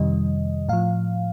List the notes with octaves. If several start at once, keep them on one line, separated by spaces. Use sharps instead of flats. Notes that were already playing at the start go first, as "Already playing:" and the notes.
Already playing: F2 C3 D#3 G3 D#5
A2 F3 F5